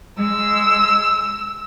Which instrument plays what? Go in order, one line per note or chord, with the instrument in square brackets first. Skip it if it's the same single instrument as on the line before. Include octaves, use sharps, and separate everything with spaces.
[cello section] G#3 [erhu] E6